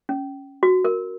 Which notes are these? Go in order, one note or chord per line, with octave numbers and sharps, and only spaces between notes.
C#4
F#4
A#4